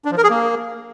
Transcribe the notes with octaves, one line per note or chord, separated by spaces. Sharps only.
D4
F3
A#4
G#4
A#3